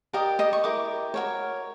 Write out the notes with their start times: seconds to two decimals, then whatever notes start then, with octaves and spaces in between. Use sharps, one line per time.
0.13 G4 A#4 D5 D#5 D#6
0.39 D#5 D#6
0.53 C#6
0.64 E4 G4 A#4 D6
1.14 F#4 A#4 C#5